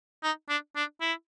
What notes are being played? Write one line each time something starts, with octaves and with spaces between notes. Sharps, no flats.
D#4
D4
D4
E4